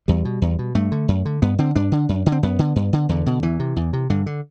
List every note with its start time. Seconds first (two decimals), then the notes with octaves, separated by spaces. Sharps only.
0.08 E2 G3
0.25 B2
0.42 E2
0.59 B2
0.75 G2 A3
0.92 D3
1.08 F#2
1.25 D3
1.42 G2 B3
1.58 D3 C4
1.76 G2 D4
1.92 D3
2.09 F#2
2.26 D3
2.32 C4
2.43 F#2 B3
2.59 D3
2.76 G2
2.93 D3
3.09 E2 D3
3.26 B2
3.43 E2 E3
3.60 C3
3.76 E2
3.93 C3
4.10 G2 D3
4.26 D3